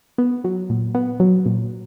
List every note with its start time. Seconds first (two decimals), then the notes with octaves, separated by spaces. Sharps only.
0.18 B3
0.44 F#3
0.70 A#2
0.95 B3
1.20 F#3
1.46 A#2